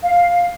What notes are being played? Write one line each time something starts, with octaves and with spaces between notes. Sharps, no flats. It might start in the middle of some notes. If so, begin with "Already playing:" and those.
F5